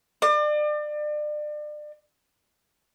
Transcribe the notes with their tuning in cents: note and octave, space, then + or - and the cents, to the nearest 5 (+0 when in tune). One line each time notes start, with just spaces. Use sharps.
D5 +35